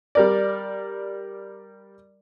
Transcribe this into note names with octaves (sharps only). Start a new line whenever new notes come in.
G3 A#4 D5